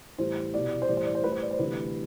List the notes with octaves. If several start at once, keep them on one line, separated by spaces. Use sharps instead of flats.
A2 E3 G3 C5
C2 B2 G3 D5
C5
A2 E3 G3 D5
C5
D5
C5
A2 G3 B4
C5
D5
C5
D2 C3 E3 G3 B4